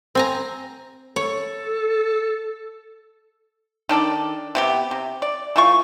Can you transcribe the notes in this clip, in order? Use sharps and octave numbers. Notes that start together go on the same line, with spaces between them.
C4 G#5 A#5
A4 C#5
D#3 D4 A4 D5
C3 B3 G4
C3
D5
E3 A3 F4 C#6